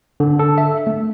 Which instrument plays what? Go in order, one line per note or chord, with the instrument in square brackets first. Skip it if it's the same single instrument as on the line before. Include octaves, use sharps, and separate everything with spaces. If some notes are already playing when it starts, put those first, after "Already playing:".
[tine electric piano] D3
A4
E5
A3